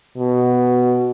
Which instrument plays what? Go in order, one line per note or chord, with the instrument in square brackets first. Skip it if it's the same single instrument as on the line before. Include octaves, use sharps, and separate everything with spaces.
[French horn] B2